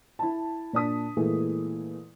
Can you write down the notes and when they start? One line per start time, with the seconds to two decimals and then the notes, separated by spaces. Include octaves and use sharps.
0.19 E4 A5
0.73 A#2 D4 A5 D#6 B6
1.17 A#2 E3 G#3 A3